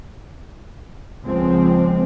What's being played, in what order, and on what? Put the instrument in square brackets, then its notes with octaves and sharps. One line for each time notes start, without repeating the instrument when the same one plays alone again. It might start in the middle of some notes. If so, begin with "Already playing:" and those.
[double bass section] C#2 F3 G#3 C4